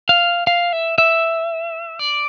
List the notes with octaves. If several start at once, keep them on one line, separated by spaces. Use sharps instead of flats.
F5
F5
E5
E5
D5